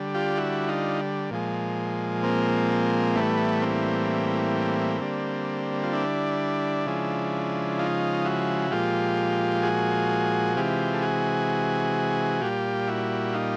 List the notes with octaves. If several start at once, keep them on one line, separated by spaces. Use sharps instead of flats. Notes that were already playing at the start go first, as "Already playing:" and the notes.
Already playing: D3 G3
F4 G4
E4 F#4
D#4 F4
A#2 F3 G#3
A#3 C4
A2 E3 G3 A3 B3
A#3 C4
D3 G3
F4
D4 E4
C#3 F3 G#3
D#4 F4
E4 F#4
A#2 F3 G#3 F4 G4
F#4 G#4
C3 E3 G#3 F4 G4
A4
F#4 G#4
A#2 G3 F4 G4
E4 F#4
D#4 F4